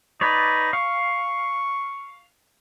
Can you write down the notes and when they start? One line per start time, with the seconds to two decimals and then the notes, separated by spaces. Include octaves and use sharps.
0.21 D#4 B4 C#5 D5
0.73 F5 C#6